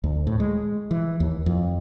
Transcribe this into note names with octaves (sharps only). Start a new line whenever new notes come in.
D2
A2
G#3
E3
D#2
F2